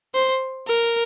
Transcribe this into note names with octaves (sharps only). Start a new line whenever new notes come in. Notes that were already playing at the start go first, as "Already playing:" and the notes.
C5
A#4